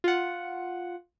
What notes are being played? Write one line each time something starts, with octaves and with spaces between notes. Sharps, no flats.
F4 F#5